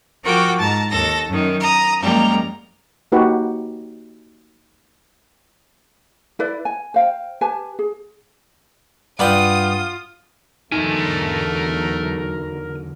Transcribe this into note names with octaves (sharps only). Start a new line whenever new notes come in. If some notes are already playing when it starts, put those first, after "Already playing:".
F3 F4 F#4 A#4 G5 D6
G#2 A5 A#5
D#2 A4 A#6
F#2 D#3
A#5 D#6
F#2 F3 G3 G#3 A#3 A#5
A#3 D#4 F#4 G4 B4
E4 B4 D5
G#5
C5 F5 G5
G4 B4 G#5 A5
G#4
G2 F4 D5 F#5 G5 B5 D#6
E2 D3 F#3 A3 D#4 A#4 G#5